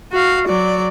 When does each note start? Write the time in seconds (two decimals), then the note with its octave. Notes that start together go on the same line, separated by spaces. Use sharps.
0.12 F#4 F5
0.47 F#3 D5